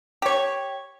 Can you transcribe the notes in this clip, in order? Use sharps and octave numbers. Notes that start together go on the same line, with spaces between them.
G4 C#5